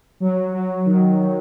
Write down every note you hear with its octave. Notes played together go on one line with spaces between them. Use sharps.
F#3
F#3
D#3
F#3